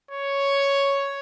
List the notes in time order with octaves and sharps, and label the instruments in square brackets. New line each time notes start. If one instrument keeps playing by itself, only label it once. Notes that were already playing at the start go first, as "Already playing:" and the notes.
[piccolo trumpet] C#5